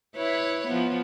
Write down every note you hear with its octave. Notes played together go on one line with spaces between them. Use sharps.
E4 B4 C#5
F3 B3